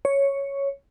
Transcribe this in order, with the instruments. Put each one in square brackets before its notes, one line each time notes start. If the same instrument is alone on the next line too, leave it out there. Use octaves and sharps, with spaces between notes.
[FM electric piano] C#5